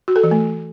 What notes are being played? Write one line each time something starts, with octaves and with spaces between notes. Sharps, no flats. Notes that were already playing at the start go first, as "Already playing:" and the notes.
F#4
A4
E3
A3